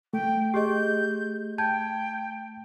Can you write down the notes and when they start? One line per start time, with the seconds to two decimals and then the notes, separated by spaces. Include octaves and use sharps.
0.13 A3 G5
0.54 G4 G#4 D#5 G6
1.58 G5 A5 G6 G#6